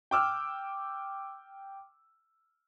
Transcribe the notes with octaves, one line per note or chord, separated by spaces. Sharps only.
G5 D6 E6 F6